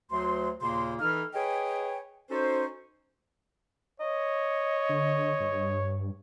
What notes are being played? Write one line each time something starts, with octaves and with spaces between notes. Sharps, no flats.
D2 F#3 C6
D#2 A#2 C#3 A#3 C6
E3 D#4 A4 F6
G#4 B4 C#5 D#5 G5 G#5
C#4 D#4 F#4 A4 C5
C#5 D#5
D3
G2